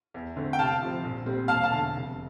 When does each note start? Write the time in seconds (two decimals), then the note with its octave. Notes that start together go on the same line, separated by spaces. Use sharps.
0.14 E2
0.36 D3 A3 C4
0.53 G5
0.59 C2 F5 A5
0.81 C3 F3 C4
1.04 A#1
1.26 A#2 G3 C4
1.48 E1 F5 A5
1.63 F5 A5
1.70 E2 D3
1.93 F1